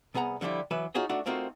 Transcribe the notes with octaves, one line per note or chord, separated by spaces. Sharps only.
C2 B3 G#4 F#5 A#5
D3 F3 G3 D4 E4
E3 F#3 B4 E5
D#4 F4 F#4 G#4 C#5 D#5
A3 D4 D#4 F#4 F#5
A3 A#3 C4 D#4 F4 F#4